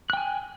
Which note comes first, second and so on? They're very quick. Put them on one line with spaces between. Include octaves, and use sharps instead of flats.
F#6 G5 G#5